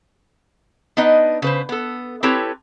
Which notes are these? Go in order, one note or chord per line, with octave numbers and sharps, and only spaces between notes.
B3 D4 D#4 B4 D#5
C#3 B4 C5
B3 A4
C4 E4 G4 A4 B4 C#5